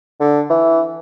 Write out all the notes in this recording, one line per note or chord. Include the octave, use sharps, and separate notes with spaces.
D3
E3